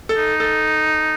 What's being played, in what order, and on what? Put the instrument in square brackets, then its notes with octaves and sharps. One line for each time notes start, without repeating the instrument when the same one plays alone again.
[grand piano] A4
[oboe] D#4
[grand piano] A4